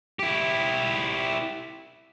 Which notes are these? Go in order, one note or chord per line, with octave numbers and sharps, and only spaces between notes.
E4 G4